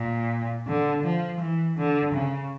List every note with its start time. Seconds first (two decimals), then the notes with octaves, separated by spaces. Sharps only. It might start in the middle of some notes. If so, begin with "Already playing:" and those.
Already playing: A#2
0.67 D3
1.04 F3
1.40 E3
1.77 D3
2.14 C#3